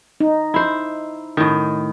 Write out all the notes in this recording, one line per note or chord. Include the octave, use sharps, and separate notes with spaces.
D#4
E4 C5
A2 D#3